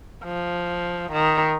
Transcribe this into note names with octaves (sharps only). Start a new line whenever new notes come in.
F3
D#3